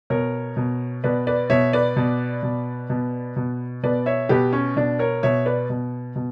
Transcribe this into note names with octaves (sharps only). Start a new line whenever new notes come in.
B2 A#4 C#5
B2
B2 B4 D5
B4 D5
B2 C#5 E5
B4 D5
B2
B2
B2
B2
B2 B4 D5
C#5 E5
B2 G4 B4
C#4
B2 D4
A#4 C#5
B2 C#5 E5
B4 D5
B2
B2